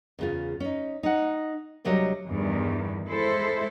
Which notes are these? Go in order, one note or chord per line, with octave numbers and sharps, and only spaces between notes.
E2 C#3 F4
C#4 D#4
D#4 F#5
D2 C3 F#3 G3 C#5 D#5
E2 G2 D#3
G#3 E4 A4 C5